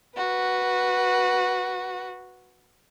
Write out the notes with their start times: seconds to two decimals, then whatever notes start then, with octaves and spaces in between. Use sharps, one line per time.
0.17 F#4 B4